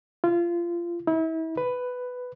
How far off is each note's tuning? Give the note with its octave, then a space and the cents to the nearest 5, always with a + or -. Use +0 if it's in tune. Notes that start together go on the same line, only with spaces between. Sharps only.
F4 -25
E4 -35
B4 +10